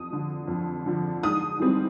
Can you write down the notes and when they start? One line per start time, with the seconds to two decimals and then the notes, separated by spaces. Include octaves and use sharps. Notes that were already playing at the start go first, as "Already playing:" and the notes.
Already playing: F2 D#6
0.10 D3 F3
0.47 F2
0.86 D3 F3
1.23 G#2 D#6
1.60 E3 G3 C4